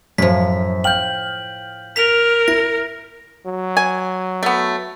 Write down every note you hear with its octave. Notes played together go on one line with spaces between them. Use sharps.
F#2 A2 F3 B6
F5 G5 F6 G6 F#7
A#4 B6 F7
E4 A#6
F#3
G#5
A3 B3